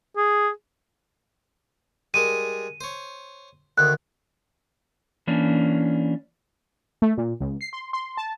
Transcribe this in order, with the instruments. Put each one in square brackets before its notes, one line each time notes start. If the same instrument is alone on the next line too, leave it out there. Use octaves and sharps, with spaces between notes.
[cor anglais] G#4
[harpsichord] G3 G#3 A#4 [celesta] D#7
[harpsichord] C5 C#5
[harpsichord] D2 D#3 [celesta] F#6
[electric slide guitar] E3 A#3 C#4 D4
[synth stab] A3
A#2
C#2
C7
C6
C6
A5